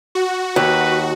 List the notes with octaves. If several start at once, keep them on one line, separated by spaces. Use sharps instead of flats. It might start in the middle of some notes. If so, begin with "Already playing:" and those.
F#4
D#2 B4